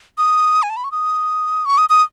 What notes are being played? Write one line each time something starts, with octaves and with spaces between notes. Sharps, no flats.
D#6
G#5
A5
B5
C#6
D#6
C#6
D#6
D#6